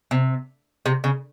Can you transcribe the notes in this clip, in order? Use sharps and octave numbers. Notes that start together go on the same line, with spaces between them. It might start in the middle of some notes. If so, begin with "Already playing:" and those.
C3
C3
C#3